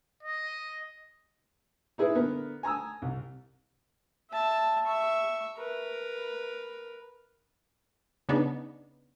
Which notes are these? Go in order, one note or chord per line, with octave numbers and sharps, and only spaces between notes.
D#5
D#4 E4 G#4 B4
D3 B3 A#4
G#5 A#5 D#6 E6
C2
E5 A5
E5 C#6
A#4 B4
C#3 B3 D4 D#4